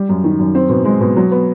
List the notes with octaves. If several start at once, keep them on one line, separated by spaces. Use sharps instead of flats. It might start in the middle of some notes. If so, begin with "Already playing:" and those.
Already playing: G3
F#2
D#3
F#2
C4
B2
G#3
B2
F#3
B3